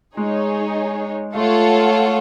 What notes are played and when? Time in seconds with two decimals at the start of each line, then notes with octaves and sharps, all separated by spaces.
0.17 G#3 D#4 G#4 C#5
1.35 A3 F4 A4 C#5 F#5